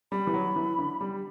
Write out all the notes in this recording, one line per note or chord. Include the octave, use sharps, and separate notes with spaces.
G3 B5
E3
F#3
E3
D3
G3